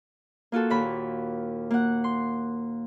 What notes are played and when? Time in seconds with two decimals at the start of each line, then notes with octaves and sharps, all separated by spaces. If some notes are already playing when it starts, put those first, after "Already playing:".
0.52 A#3 F4 F#4 A4
0.70 D#2 A#2 B5
1.71 A#3 F#5
2.04 C6